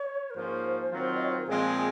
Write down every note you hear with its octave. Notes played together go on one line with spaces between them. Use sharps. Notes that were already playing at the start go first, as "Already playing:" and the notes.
Already playing: C#5
A#4
G#2 F3 A#3 C#4 F4 C5
D#3 F#3 C4 F4
D#5
C#5
C5
A#4
A#2 F3 G#3 C4 G#4